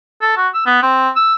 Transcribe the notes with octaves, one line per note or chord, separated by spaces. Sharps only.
A4
F#4
E6
B3
C4
E6